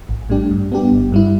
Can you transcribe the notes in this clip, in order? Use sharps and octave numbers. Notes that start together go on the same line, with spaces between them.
A1
A2 G3 D4 G4
G2
G3 B3 D4 G4
G1
G2 G3 E4